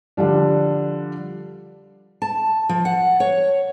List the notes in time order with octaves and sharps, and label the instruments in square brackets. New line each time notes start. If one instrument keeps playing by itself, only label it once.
[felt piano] D3 F3 G3 D4
[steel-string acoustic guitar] A5
F3
F#5
C#5